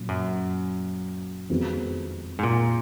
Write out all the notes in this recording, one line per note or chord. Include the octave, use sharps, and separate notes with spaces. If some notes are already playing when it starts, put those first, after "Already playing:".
Already playing: A#2 F#3 C#4
F#2
F2 D#3 G#3 B3 F#4
G#2
A#2